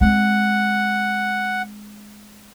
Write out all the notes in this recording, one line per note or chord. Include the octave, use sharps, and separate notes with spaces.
G#3 C4 F#5